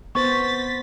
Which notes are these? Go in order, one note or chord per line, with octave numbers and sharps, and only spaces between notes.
B3 C5 C#6 A6 B6